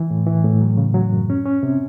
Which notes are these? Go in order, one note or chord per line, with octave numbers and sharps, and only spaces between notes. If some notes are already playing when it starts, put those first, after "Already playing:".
Already playing: E3
A2
E3
A2
F#3
C#3
F#3
F#2
C#4
C#4
C3